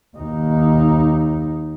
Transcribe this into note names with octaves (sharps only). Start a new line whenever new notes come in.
D#2 D#4